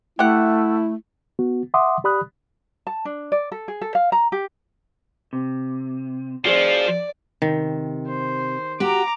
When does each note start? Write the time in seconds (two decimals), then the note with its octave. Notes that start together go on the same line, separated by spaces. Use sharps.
0.19 A3 E4 G4 F#5
1.39 B3 F#4
1.74 E5 F#5 C6 D6 D#6
2.04 G4 D5 B5 D#6 F#6
2.87 A5
3.05 D4
3.32 D5
3.52 A4
3.68 G#4
3.81 A4
3.95 F5
4.12 A#5
4.32 G4
5.33 C3
6.45 F3 F#4 G#4 C5 D5
7.42 C3 D#3
8.07 C5
8.80 F#4 G4 A#5 D6